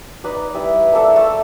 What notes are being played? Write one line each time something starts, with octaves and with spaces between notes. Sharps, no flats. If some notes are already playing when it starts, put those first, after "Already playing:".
D#4 B4 D5
G3 E4 B4
A#3 D4 E4 A4
A3 A4